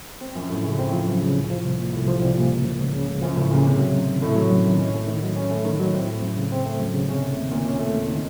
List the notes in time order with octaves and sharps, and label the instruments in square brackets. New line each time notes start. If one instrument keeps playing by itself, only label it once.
[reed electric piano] C4
[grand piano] F#2 [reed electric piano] F3
[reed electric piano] F#2 [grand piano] A2
[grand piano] F#2 [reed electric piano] C#3
[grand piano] A2 [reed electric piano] C4
[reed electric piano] F3
F#2
C#3
C2
F3
C2
A#2
[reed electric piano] C2 [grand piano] A2
[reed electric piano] F3
C2
A#2
C#2
F3
C#2
C#3
C#2
[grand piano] F#2 [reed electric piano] F3
[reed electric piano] C#2 [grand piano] A2
[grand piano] A#2 [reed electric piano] C#3
[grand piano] C3 [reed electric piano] A3
[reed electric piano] F#3
F#2
D#3
[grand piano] A2 [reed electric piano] A3
[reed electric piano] F#3
F#2
D#3
C#4
A3
D#3
F#3
C#4
A3
D#3
F#3
[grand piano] A2 [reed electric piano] C4
[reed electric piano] A3
F#2
C#3
C4
A3
F#2
C#3
[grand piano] C3 [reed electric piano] C#4
[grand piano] C3 [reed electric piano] A3
[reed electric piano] D#2 [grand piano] C3
[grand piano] A#2 [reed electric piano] D#3
[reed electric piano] C#4
A3
D#2
D#3